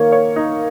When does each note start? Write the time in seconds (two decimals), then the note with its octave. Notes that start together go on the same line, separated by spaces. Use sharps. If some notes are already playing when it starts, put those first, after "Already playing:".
Already playing: D#3 A#3 A#4 C#5 F5
0.12 C#5
0.36 D#4